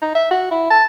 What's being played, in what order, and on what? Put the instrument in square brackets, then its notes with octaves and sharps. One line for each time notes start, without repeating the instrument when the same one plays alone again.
[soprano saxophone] D#4
E5
F#4
E4
A5